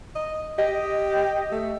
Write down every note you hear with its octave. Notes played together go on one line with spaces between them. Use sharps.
D#5
G4 D#5
A3